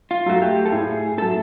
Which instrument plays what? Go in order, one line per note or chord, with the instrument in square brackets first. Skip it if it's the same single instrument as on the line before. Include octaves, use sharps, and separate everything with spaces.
[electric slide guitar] F4
[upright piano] F#3 A3 [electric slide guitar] F#4
[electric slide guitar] G4
A4
[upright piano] A2 [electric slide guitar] G#4
[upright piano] F#3 A3 [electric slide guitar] A4